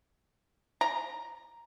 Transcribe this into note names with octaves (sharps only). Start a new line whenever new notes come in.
A#5